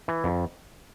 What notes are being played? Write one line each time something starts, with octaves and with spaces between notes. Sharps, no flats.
E3
F2